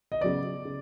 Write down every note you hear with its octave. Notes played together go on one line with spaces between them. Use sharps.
D#5
C#3 F#3 B3 D5
C#3